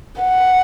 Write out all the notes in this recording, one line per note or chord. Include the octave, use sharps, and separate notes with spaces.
F#5